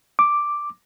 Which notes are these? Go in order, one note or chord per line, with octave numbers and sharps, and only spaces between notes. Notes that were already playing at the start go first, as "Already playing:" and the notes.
D6